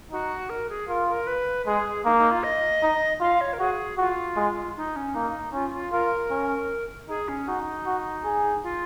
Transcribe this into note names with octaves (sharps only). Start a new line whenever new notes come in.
D#4 F#4
A#4
G#4
F4 A#4
A#4
B4
G#3 G#4
A#3 D#4
D#4
F4
D#5
D#4
F4 F5
C#5
A#4
F#4 G#4
F4 F#4
G#3
D#4
C#4
A#3 D#4
C#4 F4
F4
F4 A#4
C#4
D#4 G#4
C#4
D#4 F#4
F#4
G#4
F4